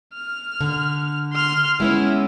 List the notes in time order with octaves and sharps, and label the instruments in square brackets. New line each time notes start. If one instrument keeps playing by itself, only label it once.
[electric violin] F6
[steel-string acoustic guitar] D3
[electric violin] C6 F6
[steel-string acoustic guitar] G#3 B3 C#4 [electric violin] E4